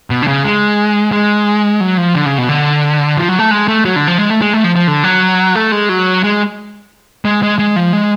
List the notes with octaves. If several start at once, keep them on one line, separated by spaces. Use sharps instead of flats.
B2
D3
C#3
G#3
G#3
F#3
F3
D3
C#3
B2
D3
F3
F#3
A3
G#3
A3
F#3
D3
F3
G#3
A3
G#3
A3
F3
F3
D3
F#3
A3
G#3
F#3
G#3
G#3
G#3
G#3
F3
G#3